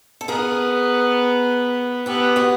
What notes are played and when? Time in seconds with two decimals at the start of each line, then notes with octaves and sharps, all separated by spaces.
0.21 A4
0.28 B3 G#4 A#4
2.06 B3 G4 A4
2.36 F#4 G#4